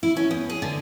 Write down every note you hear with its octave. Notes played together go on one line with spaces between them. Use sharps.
E4
C#4
E2
G#4
D3